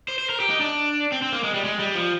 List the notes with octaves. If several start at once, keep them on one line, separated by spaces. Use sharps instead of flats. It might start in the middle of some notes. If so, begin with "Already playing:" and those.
C5
C5
A#4
G4
D#4
D4
C4
C4
A#3
G#3
G3
G#3
G3
F3